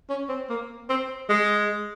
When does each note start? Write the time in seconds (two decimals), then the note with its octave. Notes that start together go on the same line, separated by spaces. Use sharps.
0.10 C#4
0.29 C4
0.50 A#3
0.89 C4
1.29 G#3